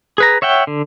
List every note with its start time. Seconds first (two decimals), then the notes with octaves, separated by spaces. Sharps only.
0.18 G#4 B4 A#5
0.42 C#5 E5 F#5 G5
0.67 D3